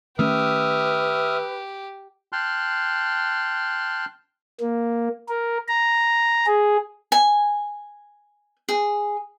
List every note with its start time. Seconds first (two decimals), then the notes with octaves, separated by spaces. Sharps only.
0.19 D#3 A3 C#4 G4 B4 E5 D#6 F6
2.32 G5 A5 C6 F6 F#6
4.61 A#3
5.28 A#4
5.68 A#5
6.47 G#4
7.12 G#5
8.69 G#4